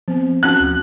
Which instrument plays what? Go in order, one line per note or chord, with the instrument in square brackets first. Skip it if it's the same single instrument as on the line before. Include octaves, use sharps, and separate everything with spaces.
[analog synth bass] F3 [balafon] B3 C4
[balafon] C#4 F#4 A5 [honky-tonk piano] F#6
[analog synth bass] D2